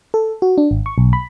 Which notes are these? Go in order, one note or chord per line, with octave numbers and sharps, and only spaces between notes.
A4
F#4
D4
G#1
C#6
B1
B5